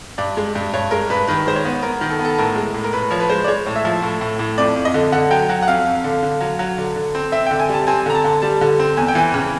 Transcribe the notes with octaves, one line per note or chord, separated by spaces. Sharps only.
G2 D5
G#3
G2
G2 C#5
G#3 A#4
G2 B4
D#3 B4
G#3 C5
C#5
B3
B3 A#4
D#3
A4
B3
A4
A2 A#4
G#3
A2
A#4
A2 B4
F3 C#5
B4
G#3 C5
D5
G#3 C#5
A2
E5
F3
A2
A2
A2
F2 D5
F2
D#5
D3
D3 F#5
F#3 G5
F#3 F#5
F#5
F2 F5
F2
D3
D3
F#3
F#3
D3
D3
C4
C4 E5
D3 G5
G#5
G3 A5
C4 G#5
D3 A#5
A5
D3
G3 A5
D3
C4
E2 G#5
G5
E3 G#5
C#3